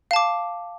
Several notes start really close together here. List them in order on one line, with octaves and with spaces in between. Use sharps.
F5 A5 D6